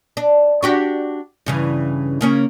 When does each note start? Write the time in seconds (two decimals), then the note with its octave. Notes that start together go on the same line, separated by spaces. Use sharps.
0.17 D4
0.63 D4 F#4 G4
1.46 G2 C#3 E3
2.21 C#3 A#3 C#4